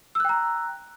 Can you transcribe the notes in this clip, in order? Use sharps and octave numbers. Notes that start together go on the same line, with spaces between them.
G5 A#5 E6 F#6